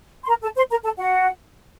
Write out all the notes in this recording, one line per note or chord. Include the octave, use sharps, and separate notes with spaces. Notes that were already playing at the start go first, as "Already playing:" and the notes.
C6
A#4 A#5
A4 A5
C5 C6
A#4 A#5
A4 A5
F#4 F#5